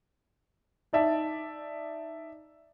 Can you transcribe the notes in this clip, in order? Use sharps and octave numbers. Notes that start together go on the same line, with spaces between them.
D#4 D5 E5 A5